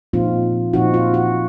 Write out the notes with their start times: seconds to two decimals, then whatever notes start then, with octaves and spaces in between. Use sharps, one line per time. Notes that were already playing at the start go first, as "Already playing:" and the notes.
0.13 A#2 F3 C4 D#4 F4
0.73 A#2 F3 C4 D#4 F#4
0.94 F4
1.14 F#4